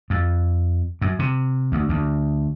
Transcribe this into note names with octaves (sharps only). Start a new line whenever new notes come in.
F2
F#2
C3
D2
D2